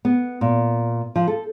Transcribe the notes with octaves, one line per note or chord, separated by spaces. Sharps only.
B3
A#2
F3
A4